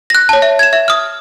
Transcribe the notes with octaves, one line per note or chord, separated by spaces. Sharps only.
F#6 A#6
C#5 A5
E5
G#6 E7
E5
D#6 F6